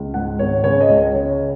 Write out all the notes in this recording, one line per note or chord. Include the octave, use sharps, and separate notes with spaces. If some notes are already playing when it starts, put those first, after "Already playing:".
Already playing: C#2
G#2 F#5
G#1 C#5
C#3 C#5
D#5
C#2
C#5
C#3 C#5